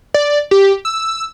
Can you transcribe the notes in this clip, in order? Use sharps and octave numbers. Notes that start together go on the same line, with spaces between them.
D5
G4
E6